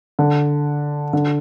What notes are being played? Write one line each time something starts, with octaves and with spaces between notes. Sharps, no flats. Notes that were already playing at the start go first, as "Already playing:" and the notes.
D3
D3